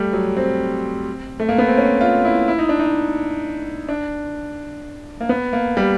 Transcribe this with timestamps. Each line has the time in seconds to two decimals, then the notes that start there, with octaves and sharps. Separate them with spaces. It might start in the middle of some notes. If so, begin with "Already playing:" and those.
Already playing: G3 A3
0.13 F#3
0.37 C4
1.40 A3
1.49 A#3
1.58 B3
1.68 C4
1.77 C#4
2.01 F4
2.25 E4
2.48 E4
2.59 D#4
2.69 D4
2.79 D#4
3.89 D4
5.21 A#3
5.29 B3
5.53 A#3
5.77 G3